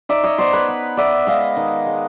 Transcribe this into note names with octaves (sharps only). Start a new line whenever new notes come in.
D#4 D5 E5
C#5 D#5
B3 C5 D5
B4 C#5
B3
B3 D5 E5
G#3 D#5 F5
D#3
G#3